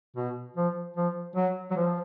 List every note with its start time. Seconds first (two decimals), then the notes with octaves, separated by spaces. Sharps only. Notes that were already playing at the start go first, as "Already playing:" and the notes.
0.16 B2
0.56 F3
0.96 F3
1.36 F#3
1.71 F#3
1.76 F3